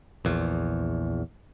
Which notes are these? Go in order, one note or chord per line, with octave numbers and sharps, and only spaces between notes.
A#1 E2